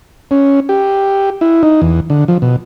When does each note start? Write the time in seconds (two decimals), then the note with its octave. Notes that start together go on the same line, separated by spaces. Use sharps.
0.31 C#4
0.69 G4
1.41 E4
1.63 D#4
1.82 E2
2.10 D3
2.28 F3
2.42 B2